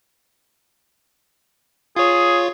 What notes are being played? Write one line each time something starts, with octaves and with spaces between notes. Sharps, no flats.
F4 G#4 C#5